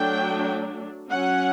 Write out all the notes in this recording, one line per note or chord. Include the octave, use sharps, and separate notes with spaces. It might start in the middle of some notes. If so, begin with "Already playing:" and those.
Already playing: F#3 A3 D4 G5
F#3 C#4 F#5